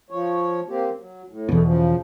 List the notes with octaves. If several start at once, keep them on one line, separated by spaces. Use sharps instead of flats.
F3 C#5
A#3 C4 G4
F#3
A2
E2 B2 A3
C#3 F3